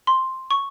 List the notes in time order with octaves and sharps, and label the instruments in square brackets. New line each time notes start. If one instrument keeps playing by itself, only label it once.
[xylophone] C6
C#6